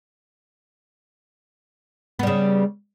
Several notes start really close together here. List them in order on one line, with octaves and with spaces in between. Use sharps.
B3 G3 C#3